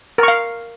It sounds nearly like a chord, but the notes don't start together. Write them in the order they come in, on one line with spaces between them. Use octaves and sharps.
A#4 C#6 F5